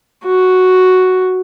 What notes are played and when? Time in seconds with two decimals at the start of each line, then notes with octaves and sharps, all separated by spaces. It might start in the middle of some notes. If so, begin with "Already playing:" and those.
0.25 F#4